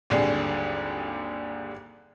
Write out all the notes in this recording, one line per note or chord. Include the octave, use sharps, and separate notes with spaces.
G#1 D#2 D3 G3 G#4 C7